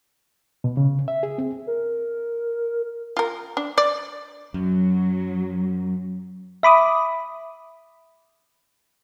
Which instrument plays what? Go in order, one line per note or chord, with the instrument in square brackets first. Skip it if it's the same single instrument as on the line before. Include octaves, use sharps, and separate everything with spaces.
[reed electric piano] B2
C#3
E5
G#4
C4
[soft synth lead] A#4
[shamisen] F4 A#4
D4
D5
[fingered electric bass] F#2 [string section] F#3
[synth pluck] E5 B5 D6 D#6